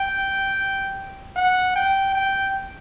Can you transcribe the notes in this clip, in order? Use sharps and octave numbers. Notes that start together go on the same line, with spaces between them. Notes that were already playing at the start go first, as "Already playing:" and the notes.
Already playing: G5
F#5
G5
G5